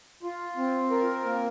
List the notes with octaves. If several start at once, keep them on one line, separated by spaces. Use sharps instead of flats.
F4
C4
A#4
A#3